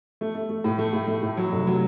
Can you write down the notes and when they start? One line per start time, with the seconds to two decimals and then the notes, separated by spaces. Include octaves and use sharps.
0.21 A3
0.35 A3
0.49 A3
0.64 A2
0.78 A3
0.93 A2
1.08 A3
1.23 A2
1.37 F#3
1.52 F1
1.67 F#3